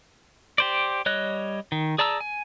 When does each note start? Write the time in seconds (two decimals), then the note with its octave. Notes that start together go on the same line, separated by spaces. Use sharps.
0.58 G4 C5 D5
1.06 G3 C#5 D#5 F#6
1.72 D#3
1.98 G#4 D5 A5 A#5 E6
2.21 G#5